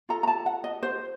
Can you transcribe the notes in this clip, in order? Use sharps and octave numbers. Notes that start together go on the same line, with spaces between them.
F4 A4 A#5
A#5
A5
F#5
D#5
C5